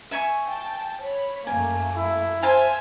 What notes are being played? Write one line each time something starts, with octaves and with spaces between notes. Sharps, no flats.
E5 G#5 C#6
G5 A5
C#5 B5
F#2 A3 A#3 G#5
E4
C5 E5 F5 G#5 A5 C6